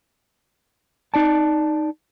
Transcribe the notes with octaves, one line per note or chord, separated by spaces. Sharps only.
D#4 D5 A5